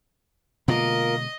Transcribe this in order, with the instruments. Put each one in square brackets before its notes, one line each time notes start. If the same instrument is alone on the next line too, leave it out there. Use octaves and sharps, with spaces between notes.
[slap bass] B2 D3 G#3 [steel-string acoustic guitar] A#3 F4 A#4 [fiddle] D#5